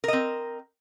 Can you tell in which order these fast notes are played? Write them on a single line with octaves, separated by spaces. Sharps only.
A#4 D#5 C4